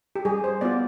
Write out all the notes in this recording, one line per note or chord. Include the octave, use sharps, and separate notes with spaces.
G4
G3 G#4
C5
B3 F4 D5